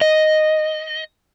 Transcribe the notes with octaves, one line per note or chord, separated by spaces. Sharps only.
D#5